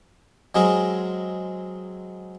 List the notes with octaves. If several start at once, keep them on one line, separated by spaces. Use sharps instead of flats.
F#3 G#3 C4 G#4 A#4